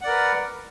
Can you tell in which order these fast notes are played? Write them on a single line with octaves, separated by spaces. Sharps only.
F#5 D5 A#4 B4